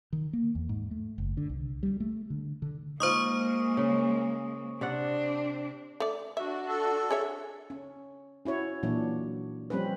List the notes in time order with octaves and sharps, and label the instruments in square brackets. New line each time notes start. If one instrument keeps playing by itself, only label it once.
[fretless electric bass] D#3
A#3
E2
G#2
A3
F#1
D3
C2
G3
A3
D3
D3
[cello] G#3 A#3 [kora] D#4 F4 [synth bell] C5 C#6 D#6
[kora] C#3
[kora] C3 D5 F#5 [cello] C4 D4
[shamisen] A3 D5
[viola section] D4 F#4 [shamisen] E5
[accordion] A4
[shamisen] G#4 C#5 E5
[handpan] C#4
C#4 E4 F#4 C#5
A#2 E3 F#3 D4
F3 G3 C4 C#4 B4